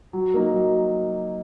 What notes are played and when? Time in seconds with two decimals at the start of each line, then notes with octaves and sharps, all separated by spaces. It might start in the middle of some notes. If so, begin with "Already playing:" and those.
0.13 F#3
0.34 A#3 D#4
0.54 F#3